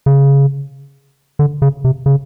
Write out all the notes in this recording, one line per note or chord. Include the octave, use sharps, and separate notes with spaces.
C#3
D3
C#3
C3
C#3